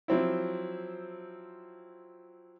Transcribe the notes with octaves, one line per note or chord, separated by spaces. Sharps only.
F3 F#3 C4 E4